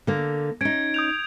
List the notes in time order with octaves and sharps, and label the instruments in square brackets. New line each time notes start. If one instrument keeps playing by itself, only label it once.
[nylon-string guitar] D3 A#3
[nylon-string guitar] C#4 D#4 [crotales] G#6 D7
[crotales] D#6 G6 F7